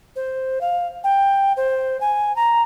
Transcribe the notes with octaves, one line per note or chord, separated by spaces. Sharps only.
C5
F5
G5
C5
G#5
A#5